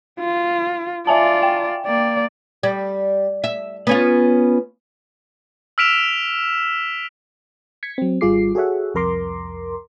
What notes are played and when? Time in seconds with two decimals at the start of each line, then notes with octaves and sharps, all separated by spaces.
0.19 F4
1.07 F4 D5 E5 G#5 A5
1.43 G5
1.86 A#3 D5
2.63 G3
3.44 E5
3.87 B3 C#4 F4
5.78 E6 F6 B6 D7 E7 F7
7.83 G#6 B6 C#7
7.98 F#3 C4
8.21 G#1 G3 F4 G#4 D6 C7
8.55 F#4 G#4 A4 C#5 E5 F#5
8.94 C2 F2 A#4 A#5 C6 D6